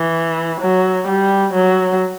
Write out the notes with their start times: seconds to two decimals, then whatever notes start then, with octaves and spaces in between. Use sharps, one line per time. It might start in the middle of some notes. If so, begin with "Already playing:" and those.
Already playing: E3
0.61 F#3
1.08 G3
1.54 F#3